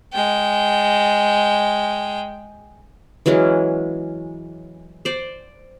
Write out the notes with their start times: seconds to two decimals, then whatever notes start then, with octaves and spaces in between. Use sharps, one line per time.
0.13 G#3 G5
3.26 E3 F#3 G#3 C#4
5.05 C5 D5